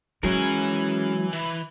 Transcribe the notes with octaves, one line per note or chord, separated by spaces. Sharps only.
E3 F#3 G#3 C#4 G#4 A#4 G#5
E3